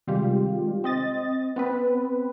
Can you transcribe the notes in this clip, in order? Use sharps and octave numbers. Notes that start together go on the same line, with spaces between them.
C3 D#3 G3 G#3 F4 G4
C4 D#5 A6
B3 C4 B4